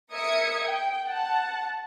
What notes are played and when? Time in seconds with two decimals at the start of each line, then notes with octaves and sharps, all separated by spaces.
0.11 A#4 E5 D#6 G#6 C#7
0.65 G5
1.06 F#5 A5